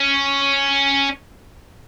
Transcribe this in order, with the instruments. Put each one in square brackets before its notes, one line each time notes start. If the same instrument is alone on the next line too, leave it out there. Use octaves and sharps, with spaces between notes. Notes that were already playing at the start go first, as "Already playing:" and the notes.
Already playing: [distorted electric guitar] C#4